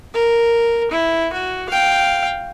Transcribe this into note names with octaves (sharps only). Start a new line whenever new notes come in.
A#4
E4
F#4
F5 G5